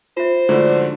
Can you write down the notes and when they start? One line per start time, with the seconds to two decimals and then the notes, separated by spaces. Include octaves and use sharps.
0.17 F4 C5 E5
0.49 G#2 D3 F3 A3 F4 F#4 D5